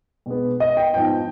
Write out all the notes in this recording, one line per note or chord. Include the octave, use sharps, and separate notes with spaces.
B2 G#3 B3
D#5
G5
G#2 F3 B3 G5